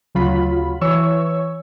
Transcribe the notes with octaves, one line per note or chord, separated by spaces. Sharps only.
D2 C#3 F#3 F4 B5
E3 C#5 C#6 E6